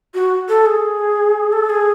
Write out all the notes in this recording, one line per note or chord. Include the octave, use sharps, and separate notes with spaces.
F#4
A4
G#4
A4
G#4